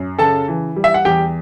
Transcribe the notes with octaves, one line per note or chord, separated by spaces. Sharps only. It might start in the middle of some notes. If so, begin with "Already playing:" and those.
Already playing: F#2
C#3 A4 A5
E3
G3
E5
F#5
E2 G4 G5